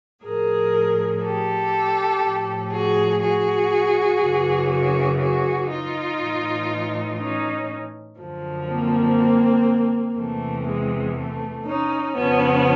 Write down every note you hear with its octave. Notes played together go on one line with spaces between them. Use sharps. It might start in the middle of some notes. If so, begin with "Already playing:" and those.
A2 F3 G#4 A#4
G4 A4
A2 F3
F#4 G#4
F#4 G#4
F#2 C#3 E3
F#4 G#4
F#4 G#4
D#4 F4
A2 E3
C#4 D#4
F#2 D3 F3
A#3 C4
E2 C3 E3 A3
G#3
A3
C#4 D#4
F2 C#3 F3 B3 C#4